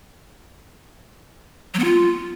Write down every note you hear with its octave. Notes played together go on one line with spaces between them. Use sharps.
F#3
B3
F4